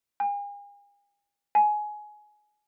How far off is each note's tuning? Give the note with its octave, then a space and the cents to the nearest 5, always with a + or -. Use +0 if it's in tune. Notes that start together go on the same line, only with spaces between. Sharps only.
G#5 -45
G#5 +15